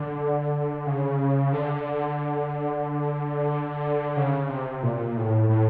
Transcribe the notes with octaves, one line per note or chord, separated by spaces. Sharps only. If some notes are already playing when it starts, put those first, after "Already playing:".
Already playing: D3
C#3
D3
C#3
C3
A#2
A2
A2